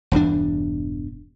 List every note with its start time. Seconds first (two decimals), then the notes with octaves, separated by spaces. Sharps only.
0.12 E1 E2 G2 D4